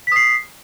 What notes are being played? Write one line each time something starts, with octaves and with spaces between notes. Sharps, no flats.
D#6 B6 C7